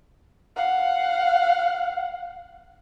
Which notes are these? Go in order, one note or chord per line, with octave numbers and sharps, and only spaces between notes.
F5 F#5